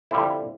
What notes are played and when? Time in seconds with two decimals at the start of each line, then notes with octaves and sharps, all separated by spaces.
0.11 F2 D3 G3 E4